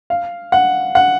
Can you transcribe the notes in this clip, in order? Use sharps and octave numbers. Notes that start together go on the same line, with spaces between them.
F5
F#5
F#5